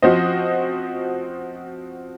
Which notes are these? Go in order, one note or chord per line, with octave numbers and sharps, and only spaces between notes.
F3 C4 F#4 C5 D#5